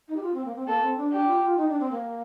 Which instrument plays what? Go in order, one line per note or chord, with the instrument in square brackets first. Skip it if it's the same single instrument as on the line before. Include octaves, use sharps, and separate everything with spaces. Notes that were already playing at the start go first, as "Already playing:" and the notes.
[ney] D#4
G4
F4
C4
A#3
C4
[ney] A#3 [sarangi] A4
[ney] C4
D4
[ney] D4 [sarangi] G4
[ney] F4
F4
D#4
D4
C4
A#3